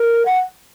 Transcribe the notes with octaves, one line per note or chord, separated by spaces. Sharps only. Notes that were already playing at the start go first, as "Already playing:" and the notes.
Already playing: A#4
F#5